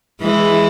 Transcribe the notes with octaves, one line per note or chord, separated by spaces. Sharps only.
E3 G#3